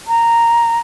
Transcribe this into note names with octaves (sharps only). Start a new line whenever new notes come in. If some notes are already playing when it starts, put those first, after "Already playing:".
A#5